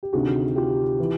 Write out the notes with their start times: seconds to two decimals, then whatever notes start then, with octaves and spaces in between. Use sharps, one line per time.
0.03 G4
0.13 D2 C3 D#3 F#4 G#4
0.56 F4 G4
1.00 E3